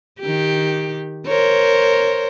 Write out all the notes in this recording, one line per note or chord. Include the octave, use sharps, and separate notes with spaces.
D#3 G4
A#4 C5 C#5